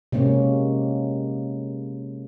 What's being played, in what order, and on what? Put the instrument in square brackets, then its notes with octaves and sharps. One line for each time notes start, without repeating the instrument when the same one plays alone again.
[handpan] C3 G#3 A#3 C#4